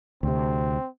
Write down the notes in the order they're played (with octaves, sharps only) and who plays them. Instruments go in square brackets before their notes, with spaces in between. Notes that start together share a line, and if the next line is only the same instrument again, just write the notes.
[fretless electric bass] D2 C3 [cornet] C4